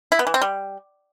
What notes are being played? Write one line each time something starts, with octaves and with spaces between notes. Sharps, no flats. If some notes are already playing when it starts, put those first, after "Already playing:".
E4
B3
E3
C4
G3